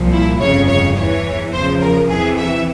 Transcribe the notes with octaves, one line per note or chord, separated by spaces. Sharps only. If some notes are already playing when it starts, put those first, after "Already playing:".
Already playing: C2 A#2 F3
E4
G1 F2 C#3 C#5
C#5
E2 E3 C#5
E2 C#3 F3 C5
A#4
E2 C3 E3 G#4
E5